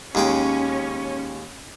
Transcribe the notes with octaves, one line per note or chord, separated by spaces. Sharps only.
D#2 G#3 C#4 G5